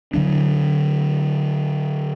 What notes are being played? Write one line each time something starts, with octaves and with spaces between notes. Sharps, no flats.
D3 D#3 F#3 D4